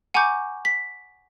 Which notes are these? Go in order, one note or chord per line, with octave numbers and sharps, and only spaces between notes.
F#5 G#5 A#5 C#6 D6 G6
B6